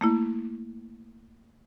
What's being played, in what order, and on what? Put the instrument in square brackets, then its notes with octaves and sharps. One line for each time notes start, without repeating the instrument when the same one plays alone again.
[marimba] A3 A#3 E4